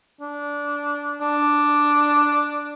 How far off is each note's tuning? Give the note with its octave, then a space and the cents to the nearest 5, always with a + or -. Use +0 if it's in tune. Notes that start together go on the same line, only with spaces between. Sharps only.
D4 -15
D4 +0